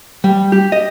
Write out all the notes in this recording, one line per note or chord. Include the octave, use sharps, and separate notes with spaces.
G3
G4
D#5